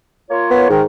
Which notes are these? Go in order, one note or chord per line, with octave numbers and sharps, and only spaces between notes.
A#3 F4 C#5
B3
G#2 D#3